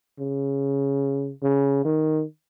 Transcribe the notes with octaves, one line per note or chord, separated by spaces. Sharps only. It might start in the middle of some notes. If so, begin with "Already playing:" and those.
C#3
C#3
D#3